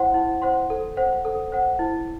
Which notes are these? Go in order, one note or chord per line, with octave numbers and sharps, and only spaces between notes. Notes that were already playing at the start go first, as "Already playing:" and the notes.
Already playing: E4 C5 F#5 C6
E4
C5 F#5 C6
A4
C5 F#5
A4
C5 F#5
E4